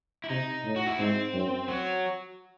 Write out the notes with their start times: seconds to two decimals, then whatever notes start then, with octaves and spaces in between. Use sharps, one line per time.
0.24 E4
0.29 C3 D#4
0.64 A2
0.76 F#4
0.87 E4
0.98 G#2 C4
1.33 F#2
1.68 F#3